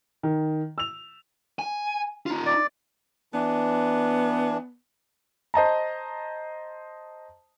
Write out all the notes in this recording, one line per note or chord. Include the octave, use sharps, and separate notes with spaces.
D#3
E6 F7
G#5
D#4 F4
D5
E3 B3 D4
C5 D#5 A5 A#5